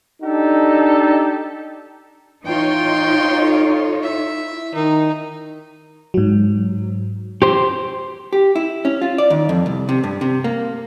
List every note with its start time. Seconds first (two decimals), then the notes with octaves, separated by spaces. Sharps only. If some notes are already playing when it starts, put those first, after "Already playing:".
0.22 D4 D#4 G4 A4
2.45 E3 D#4 F4 C#5 G5 C6
3.42 A4
4.03 E4 E5
4.75 D#3 D#4
6.14 G#2 F#3
7.42 G4 C5 C6
8.33 G4
8.56 E4
8.85 C#4
9.02 F4
9.18 D5
9.30 D#2
9.49 F2
9.66 C2
9.89 C3
10.04 G2
10.21 C3
10.44 A#3